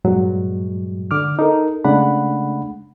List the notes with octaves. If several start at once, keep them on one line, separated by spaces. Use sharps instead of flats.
G2 A#2 F#3 G#3
D3 D6 F6
D#4 A4 A#4
C#3 G#3 A3 D4 F#5 B5